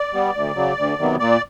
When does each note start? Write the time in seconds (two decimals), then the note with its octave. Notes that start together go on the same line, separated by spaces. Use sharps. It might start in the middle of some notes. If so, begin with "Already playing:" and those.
Already playing: D5
0.13 G3 B3
0.35 D2
0.56 C#3 F#3
0.77 D2
0.99 C3 D#3 F#3 B3
1.19 A#2 D5